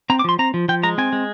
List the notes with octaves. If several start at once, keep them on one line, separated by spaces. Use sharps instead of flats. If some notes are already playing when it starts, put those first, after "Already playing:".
C4 A#5
D6
F3 C6
C4 A#5
F3
F3 G5
G#3 A#5
C4 G#5
G#3